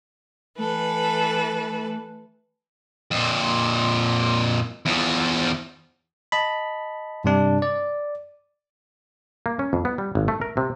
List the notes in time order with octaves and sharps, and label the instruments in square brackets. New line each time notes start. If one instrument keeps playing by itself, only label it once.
[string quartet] E3 A4 B4 [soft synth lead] A3
[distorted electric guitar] F2 A#2
E2 F3
[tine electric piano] D#5 A5 B5
G2 C3 D4
D5
[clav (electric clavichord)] A#3
C#4
F2
B3
G3
G#1
A3
A#4
C3